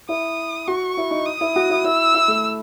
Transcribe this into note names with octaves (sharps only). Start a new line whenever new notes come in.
E4 D#6
F#4 C#6
E4
D#4
D#6
E4
F#4
E4
E4 E6
E4
A3